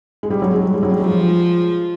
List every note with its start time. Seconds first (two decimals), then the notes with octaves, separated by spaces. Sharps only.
0.23 G#3
0.30 G3
0.42 F#3
0.54 G#3
0.65 G#3
0.74 G3
0.83 F#3
0.91 G3
1.00 F3 G#3